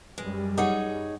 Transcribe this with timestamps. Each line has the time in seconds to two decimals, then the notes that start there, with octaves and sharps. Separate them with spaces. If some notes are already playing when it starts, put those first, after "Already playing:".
0.18 F#2 G3 G#3 B4
0.58 D#4 G#4 C#5 F#5 D6 D#6